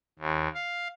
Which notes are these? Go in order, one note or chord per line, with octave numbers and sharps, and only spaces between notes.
D#2
F5